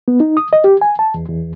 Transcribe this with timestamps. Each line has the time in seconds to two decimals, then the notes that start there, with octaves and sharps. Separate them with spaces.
0.08 B3
0.20 D#4
0.37 D#6
0.53 D#5
0.64 G4
0.81 G#5
0.99 A5
1.14 E2
1.28 E2